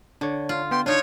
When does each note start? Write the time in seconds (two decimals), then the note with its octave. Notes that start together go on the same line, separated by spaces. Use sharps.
0.21 D3 D4 C#5
0.49 F4
0.71 B3 G5 C6
0.86 D4 D#4 F4 C#5